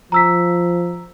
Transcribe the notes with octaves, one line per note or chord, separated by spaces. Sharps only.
F3 A#5 E6 B6